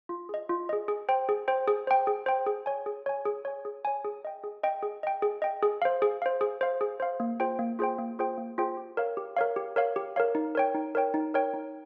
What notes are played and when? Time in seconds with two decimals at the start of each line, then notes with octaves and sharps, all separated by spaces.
0.09 F4
0.29 G#4 D#5
0.49 F4
0.69 G#4 D#5
0.88 G#4
1.09 C5 G5
1.29 G#4
1.48 C5 G5
1.68 G#4
1.87 C5 G5
2.07 G#4
2.26 C5 G5
2.46 G#4
2.66 C#5 G#5
2.86 G#4
3.06 C#5 G#5
3.25 G#4
3.45 C#5 G#5
3.65 G#4
3.85 C#5 G#5
4.05 G#4
4.25 D#5 G5
4.44 G#4
4.63 D#5 G5
4.83 G#4
5.03 D#5 G5
5.22 G#4
5.42 D#5 G5
5.63 G#4
5.82 C5 F5
6.02 G#4
6.22 C5 F5
6.41 G#4
6.61 C5 F5
6.81 G#4
7.00 C5 F5
7.20 A#3
7.40 F4 G#4 C5 G5
7.59 A#3
7.79 F4 G#4 C5 G5
7.99 A#3
8.19 F4 G#4 C5 G5
8.38 A#3
8.58 F4 G#4 C5 G5
8.77 G4
8.97 A#4 C#5 F5
9.17 G4
9.37 A#4 C#5 F5
9.56 G4
9.76 A#4 C#5 F5
9.96 G4
10.16 A#4 C#5 F5
10.35 D#4
10.55 A#4 C#5 G5
10.74 D#4
10.95 A#4 C#5 G5
11.14 D#4
11.34 A#4 C#5 G5
11.54 D#4